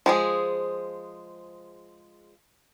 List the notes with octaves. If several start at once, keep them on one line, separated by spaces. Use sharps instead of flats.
F3 G#3 G#4